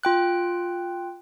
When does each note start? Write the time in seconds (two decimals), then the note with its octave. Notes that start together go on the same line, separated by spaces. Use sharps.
0.03 F4 G5 F#6